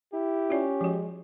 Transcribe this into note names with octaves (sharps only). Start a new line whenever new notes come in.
E4 G4
C#4 F4 D5
F3 G#3 F#4